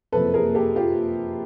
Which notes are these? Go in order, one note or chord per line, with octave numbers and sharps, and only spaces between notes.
F#1 F2 C3 F3 A#3 A4 B4
G#4 A#4
G4 A4
F4 G4